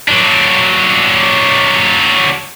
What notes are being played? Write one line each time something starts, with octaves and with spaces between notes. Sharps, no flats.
F#3 D4